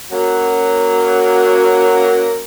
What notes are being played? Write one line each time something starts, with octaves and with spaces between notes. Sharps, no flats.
F#3 A#3 C#4 F#4